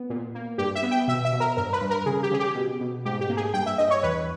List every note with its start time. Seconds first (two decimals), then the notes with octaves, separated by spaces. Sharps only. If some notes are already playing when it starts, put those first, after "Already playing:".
Already playing: B3
0.10 A#2
0.35 A#3
0.58 G2 G4
0.75 E5
0.83 B3
0.91 G5
1.07 B2 E5
1.25 E5
1.33 B2
1.40 A#4
1.57 G2 A#4
1.73 B4
1.81 G2
1.90 A#4
2.06 C#3 G#4
2.23 G4
2.31 C#3 G#4
2.39 G4
2.55 B2
2.81 B2
3.05 G#2 G4
3.21 G4
3.29 A#3
3.37 G#4
3.53 G2 G5
3.66 E5
3.78 G2 D#5
3.90 C#5
4.03 E2 B4